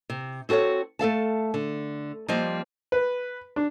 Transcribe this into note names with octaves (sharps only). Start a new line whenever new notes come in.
C3
C4 F#4 A4 A#4 C#5
A3 A4 F5 A5
D3
F3 G3 A#3 C4 D#5
B4
D4